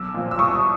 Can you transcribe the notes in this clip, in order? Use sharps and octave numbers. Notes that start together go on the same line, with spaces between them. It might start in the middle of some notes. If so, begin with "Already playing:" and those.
Already playing: B1 D6 E6
A#2 F3
E6
C2 C#6 D#6